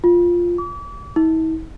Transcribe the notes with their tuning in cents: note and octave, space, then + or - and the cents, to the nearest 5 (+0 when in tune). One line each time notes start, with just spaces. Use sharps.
F4 +0
D6 -40
E4 -45